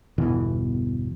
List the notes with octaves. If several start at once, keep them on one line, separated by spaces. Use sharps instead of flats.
G1 E2 B2 E3